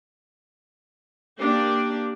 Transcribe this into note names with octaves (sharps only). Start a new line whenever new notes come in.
A#3 D4 G4 D5